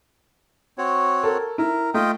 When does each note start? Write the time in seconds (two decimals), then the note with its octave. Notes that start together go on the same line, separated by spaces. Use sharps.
0.78 C4 F#4 C#5
1.23 A4 A#4
1.58 E4 A#4
1.94 A3 F4 D#5 G5